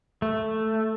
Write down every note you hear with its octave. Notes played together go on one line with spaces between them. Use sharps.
A3